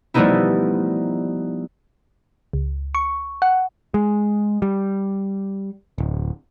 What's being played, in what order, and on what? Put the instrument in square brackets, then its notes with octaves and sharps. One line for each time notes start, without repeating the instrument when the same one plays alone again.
[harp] F3 G3 A3 B3 D#4 E4
[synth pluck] C#2
C#6
F#5
[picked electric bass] G#3
G3
D1